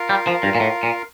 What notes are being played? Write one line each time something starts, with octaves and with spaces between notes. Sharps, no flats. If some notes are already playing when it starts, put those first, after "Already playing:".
Already playing: F4 A#4 F5
G3
F3
G2
A#2
A2
A#2